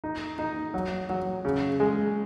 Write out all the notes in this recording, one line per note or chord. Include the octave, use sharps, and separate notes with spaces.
D#4
D#4
F#3
F#3
C#3
G#3